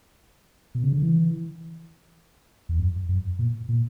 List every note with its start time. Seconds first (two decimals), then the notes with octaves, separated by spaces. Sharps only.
0.75 B2
0.83 C#3
0.93 D3
1.02 E3
2.69 E2
2.80 F#2
3.09 F#2
3.39 A#2
3.69 A#2